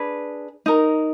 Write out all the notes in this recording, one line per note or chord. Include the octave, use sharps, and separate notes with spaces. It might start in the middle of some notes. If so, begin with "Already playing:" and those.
Already playing: D4 G#4 B4
D#4 A#4